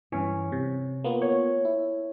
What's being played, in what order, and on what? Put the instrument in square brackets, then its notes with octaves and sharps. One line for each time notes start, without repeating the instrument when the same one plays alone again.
[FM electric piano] G2 E3 [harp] C#4
[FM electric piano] C3
A#3 B3 F4
[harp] C#5
[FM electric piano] E4